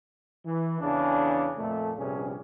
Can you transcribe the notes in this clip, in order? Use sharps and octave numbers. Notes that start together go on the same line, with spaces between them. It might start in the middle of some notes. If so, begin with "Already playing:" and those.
E3
E2 C#3 D4
F2 A#2 A3
A#1 G2 C3 C#4 G#4